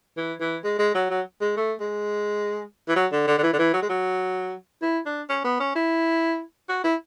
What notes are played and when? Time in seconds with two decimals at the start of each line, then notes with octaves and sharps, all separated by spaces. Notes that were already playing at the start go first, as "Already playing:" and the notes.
0.17 E3
0.40 E3
0.64 G#3
0.79 G#3
0.94 F#3
1.10 F#3
1.41 G#3
1.57 A3
1.80 G#3
2.88 E3
2.96 F#3
3.12 D3
3.27 D3
3.38 D3
3.43 E3
3.53 D3
3.59 E3
3.74 F#3
3.82 G#3
3.89 F#3
4.82 E4
5.06 D4
5.29 C#4
5.44 B3
5.60 C#4
5.76 E4
6.69 F#4
6.84 E4